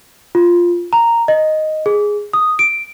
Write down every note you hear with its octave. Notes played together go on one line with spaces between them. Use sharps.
F4
A#5
D#5
G#4
D#6
D7